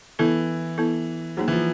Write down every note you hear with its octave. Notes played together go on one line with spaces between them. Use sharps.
E3 B3 E4 A4
B3 E4 A4
F#3 A#3 D#4 G#4 C5
E3
F3